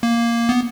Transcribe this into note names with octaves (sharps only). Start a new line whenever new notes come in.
A#3
B3